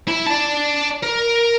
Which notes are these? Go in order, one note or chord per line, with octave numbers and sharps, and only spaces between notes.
E4
D5 A5
A#4